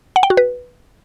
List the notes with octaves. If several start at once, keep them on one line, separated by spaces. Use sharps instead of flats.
F#5
G5
F#4
B4